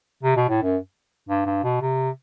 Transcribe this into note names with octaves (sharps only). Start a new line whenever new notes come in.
C3
B2
A2
F#2
G2
G2
B2
C3